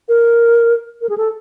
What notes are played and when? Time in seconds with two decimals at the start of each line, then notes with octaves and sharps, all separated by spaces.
0.09 A#4
1.01 A#4
1.09 G#4
1.18 A4